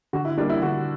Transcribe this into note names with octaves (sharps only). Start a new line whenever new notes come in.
D3 F#4
E4
G3 A#3 D4
E4
D3 F#4